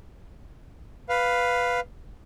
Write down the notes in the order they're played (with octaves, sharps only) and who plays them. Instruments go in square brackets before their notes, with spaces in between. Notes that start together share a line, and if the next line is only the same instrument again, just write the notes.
[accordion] B4 F5